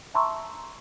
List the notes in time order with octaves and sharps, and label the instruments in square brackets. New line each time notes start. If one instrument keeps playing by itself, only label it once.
[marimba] E5 A5 A#5 C6 C#6 E6